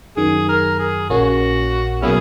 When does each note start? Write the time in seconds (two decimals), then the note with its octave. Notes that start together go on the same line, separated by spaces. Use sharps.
0.17 F#2 D#3 F#3 G#4
0.49 A#4
0.79 G#4
1.10 A#1 A#2 A#3 C#4 F#4
2.02 B2 F#3 A#3 C#4 E4 G#4